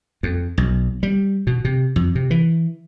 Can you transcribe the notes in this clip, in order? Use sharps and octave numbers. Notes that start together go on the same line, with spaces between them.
F2
B1
G3
B2
C3
F2
C3
E3